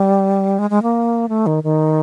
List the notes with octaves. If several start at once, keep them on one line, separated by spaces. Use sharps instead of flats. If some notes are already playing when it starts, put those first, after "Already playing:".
Already playing: G3
G#3
G#3
A#3
A3
D#3
D#3